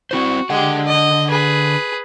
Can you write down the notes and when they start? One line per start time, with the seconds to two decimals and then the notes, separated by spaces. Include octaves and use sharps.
0.11 C4 E4 F#4 C5
0.50 D3 G#3 G4 F#5
0.87 D#5
1.29 G#4 B4